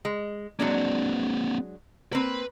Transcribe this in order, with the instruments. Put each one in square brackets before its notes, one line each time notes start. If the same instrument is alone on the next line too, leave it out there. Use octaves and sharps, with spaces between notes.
[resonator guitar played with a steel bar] G#3
[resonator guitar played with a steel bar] F#3 G#3 D4 [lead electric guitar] A#3 C4
[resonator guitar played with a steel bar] A#3 C4 [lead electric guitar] B4 B5